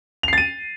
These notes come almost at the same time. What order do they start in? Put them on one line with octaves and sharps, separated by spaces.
F7 C7 A6 D#7